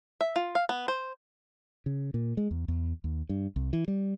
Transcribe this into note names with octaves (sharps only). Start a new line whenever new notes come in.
E5
F4
F5
B3
C5
C#3
A#2
G#3
E2
E2
D#2
G2
C2
E3
G3